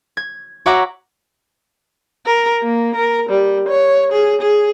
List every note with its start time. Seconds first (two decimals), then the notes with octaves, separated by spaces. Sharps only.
0.17 G#6
0.66 F#4 C#5 E5 F#5 A#5 D6
2.26 A#4
2.63 A#3
2.95 A#4
3.29 G3
3.68 C#5
4.12 G#4
4.41 G#4